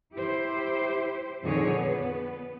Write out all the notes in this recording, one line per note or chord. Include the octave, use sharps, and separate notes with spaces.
E4 G4 C5
F2 A#2 D3 D#3 G#4 C#5
B3